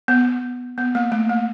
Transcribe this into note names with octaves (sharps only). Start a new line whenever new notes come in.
B3
B3
A#3
A3
A#3